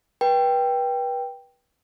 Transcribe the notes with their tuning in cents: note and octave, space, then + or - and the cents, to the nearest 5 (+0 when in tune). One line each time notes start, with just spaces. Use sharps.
B4 -30 G5 +0